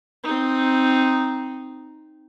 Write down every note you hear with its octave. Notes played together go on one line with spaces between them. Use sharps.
C4 D#4